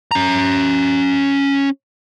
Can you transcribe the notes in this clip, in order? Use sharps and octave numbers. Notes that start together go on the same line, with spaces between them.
C#4 A#5